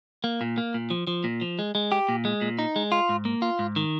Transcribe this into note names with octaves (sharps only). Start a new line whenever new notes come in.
A#3
A#2
A#3
A#2
F3
F3
A#2
F3
G#3
G#3
G4
A#2
G#3
A#2
D#4
G#3
F4
G#2
A#3
F4
G#2
D#3